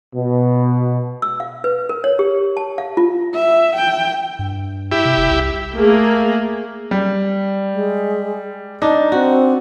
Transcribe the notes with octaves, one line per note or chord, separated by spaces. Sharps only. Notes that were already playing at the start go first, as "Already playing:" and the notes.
B2
E6
F5
B4
A#4
C#5
G4
A5
F5
F4
E5
G5
G2
E4 G4
C3
F1
C2
A3 A#3 G#4
G3
G#3
D4 D#4 D#5
C4 F#4